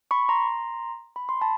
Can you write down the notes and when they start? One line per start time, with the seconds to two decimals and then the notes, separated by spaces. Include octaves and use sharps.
0.11 B5 C#6
0.29 A#5 C6
1.16 B5
1.29 C6
1.41 A5 B5